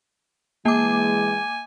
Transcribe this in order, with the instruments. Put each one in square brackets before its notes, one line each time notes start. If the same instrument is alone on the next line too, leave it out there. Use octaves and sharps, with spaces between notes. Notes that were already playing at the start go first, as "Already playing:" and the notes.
[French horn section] E3 G#3 [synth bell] A#3 D6 [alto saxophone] G#5